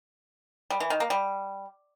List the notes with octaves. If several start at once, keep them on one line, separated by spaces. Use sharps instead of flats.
G3
E3
D#3
A#3
G3